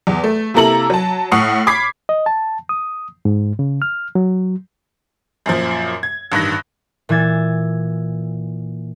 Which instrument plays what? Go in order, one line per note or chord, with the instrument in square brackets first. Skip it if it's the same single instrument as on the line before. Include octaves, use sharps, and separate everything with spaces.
[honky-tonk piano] E2
A3
C3 A#3 E4 A4 A#5 F#7
F#3 A5
A2 F#5 C#6 D#6 F6 C7
B5 D6 G#6 B6 C7
[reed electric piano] D#5
A5
D#6
G#2
C#3
F6
F#3
[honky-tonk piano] F#2 A#2 F3
G#6
A1 G2 D#3 F#6 A#6
[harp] A#2 E3 E6 G#6 A6